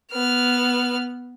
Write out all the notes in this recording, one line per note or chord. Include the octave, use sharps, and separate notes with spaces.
B3 F6